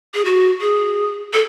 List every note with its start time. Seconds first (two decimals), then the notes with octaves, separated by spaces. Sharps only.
0.14 G#4
0.25 F#4
0.61 G#4
1.33 A4